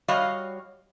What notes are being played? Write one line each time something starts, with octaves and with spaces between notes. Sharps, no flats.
G3 F#4 C#5 D#5 F5